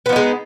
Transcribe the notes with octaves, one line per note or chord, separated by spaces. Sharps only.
F3 G#3 B3 D#4